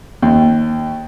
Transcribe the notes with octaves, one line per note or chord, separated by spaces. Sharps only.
D#2